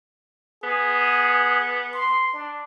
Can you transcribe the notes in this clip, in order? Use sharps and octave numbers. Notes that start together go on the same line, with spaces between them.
B3 G#4
C6
D4